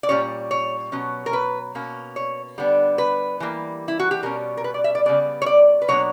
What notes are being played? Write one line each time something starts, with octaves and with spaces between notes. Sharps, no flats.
D5
A#2 G3 C#4 C#5
C#5
B2 F#3 C#4
A#4
B4
B2 A#3 C#4
C#5
D3 G3 B3 D4
B4
E3 G3 A#3
E4
F#4
G4
B2 G3 C#4 A#4
A#4
B4
D5
E5
D5
C#3 G3 B3 D5
C#5
D5
B4
B2 F#3 A#3 D4 C#5